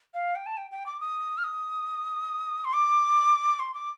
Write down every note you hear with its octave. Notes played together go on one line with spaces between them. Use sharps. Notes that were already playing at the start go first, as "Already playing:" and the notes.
F5
G5
A5
G5
G5
D6
D#6
F6
D#6
C6
D6
C6
D6